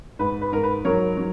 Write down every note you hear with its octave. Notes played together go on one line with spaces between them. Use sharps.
G#2 B4
B4
G#2 A#4
B4
F#3 A#4 C#5
F#3